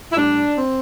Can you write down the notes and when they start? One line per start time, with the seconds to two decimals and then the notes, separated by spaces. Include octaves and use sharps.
0.12 E4
0.17 A2 G3 D4
0.58 C4